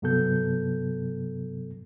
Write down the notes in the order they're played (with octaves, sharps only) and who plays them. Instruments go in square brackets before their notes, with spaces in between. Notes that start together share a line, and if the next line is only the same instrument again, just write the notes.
[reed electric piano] G2 C3 F#3 B3 A4 G6